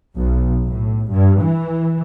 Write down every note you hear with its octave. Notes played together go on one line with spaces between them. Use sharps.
B1
A2
G2
E3